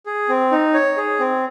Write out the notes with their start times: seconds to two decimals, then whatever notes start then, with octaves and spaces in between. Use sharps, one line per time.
0.06 G#4
0.29 C4
0.52 D#4
0.74 C#5
0.97 G#4
1.20 C4